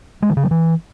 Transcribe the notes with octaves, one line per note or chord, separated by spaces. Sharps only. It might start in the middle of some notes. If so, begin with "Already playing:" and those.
G#3
D#3
C#3
F#3
E3